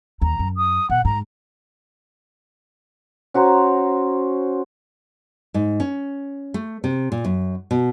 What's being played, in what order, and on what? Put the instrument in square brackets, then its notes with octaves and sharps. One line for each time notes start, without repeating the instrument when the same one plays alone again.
[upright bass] D#2 [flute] A#5
[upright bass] F#2
[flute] D#6
[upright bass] B2 [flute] F#5
[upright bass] G#2 [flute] A#5
[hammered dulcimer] C#4 F#4 C5 A#5
[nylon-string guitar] G#2
C#4
A3
C3
A#2
F#2
B2